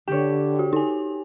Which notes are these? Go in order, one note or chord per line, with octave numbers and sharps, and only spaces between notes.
D3 G4 C#5 G5
F#4
D#4 G#5